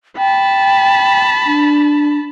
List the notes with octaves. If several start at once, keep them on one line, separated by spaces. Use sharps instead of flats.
G5 A5 B5
D4